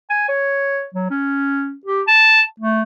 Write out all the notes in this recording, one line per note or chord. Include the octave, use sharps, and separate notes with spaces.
G#5
C#5
F#3
C#4
G4
A5
A3